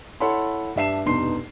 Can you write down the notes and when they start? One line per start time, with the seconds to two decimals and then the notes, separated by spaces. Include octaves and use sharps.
0.20 E4 A4 C#5 F#5 B5 C6
0.76 G2 D4 E5 C7 E7
1.06 F1 G2 B2 D#4 C6 C7